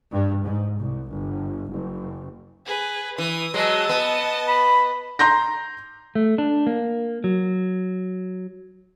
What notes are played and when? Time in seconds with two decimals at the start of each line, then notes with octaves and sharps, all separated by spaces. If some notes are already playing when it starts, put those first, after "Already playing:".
0.12 G2
0.43 G#2
0.79 C2
1.09 G1
1.71 F#1
2.66 G#4 B4
3.18 E3 D#6
3.54 F#3 G#3 D#5 A5
3.89 B3
4.48 B5
5.19 A#5 C6 G6 A#6
6.15 A3
6.38 D4
6.67 A#3
7.24 F#3